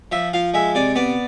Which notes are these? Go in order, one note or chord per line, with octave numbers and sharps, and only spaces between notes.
F3 E5
F3 F5
G#3 E5
C3 D5
B3 D5